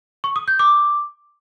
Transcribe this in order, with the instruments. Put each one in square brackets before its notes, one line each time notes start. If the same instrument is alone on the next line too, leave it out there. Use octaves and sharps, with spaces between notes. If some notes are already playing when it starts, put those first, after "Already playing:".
[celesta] C#6
D#6
G6
D6